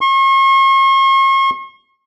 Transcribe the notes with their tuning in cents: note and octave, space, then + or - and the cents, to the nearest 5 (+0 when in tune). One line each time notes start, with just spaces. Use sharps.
C#6 -45